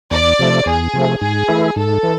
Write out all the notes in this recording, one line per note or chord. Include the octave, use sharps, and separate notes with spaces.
E2 D5
C3 F3 A3
E2 G#4
C3 F3 A3
G#2 G#4
E3 A3 E4
G#2 A4
E3